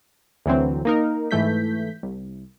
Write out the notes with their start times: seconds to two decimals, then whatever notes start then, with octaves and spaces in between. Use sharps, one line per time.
0.46 D2 D3 E3 F#3 C4
0.85 A#3 D#4 A#4
1.31 G#2 E3 A3 G6 B6
2.03 C2